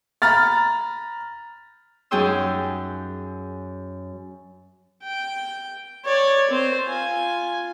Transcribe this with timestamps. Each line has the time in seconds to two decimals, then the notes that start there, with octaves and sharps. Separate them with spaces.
0.22 A#5 B5 F6 A6
2.11 F#2 D#4 G#4 G5 C6 E6
5.02 G5
6.04 C#5 D5
6.50 C4 C5
6.86 F4 G#5